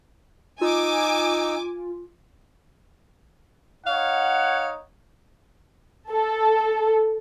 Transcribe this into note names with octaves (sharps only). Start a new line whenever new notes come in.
D#4 F4 G#5 D6 E6
D#4 C#5 F5 F#5
A4